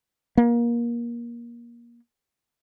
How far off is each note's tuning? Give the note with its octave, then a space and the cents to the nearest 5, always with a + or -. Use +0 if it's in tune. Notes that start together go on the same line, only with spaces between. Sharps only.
A#3 +25